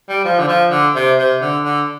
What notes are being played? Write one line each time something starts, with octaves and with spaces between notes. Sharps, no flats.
G3
F3
D3
F3
D3
C3
C3
D3
D3